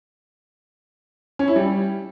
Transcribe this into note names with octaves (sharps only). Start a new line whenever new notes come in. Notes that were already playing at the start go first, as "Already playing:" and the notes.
C#4
E4
G3